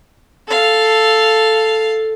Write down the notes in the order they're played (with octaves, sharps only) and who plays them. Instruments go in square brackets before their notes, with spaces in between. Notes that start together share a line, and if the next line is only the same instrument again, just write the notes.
[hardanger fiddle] A4 F5